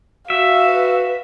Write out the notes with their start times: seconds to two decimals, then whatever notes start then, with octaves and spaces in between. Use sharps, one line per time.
0.30 F#4 E5 F5
0.66 B4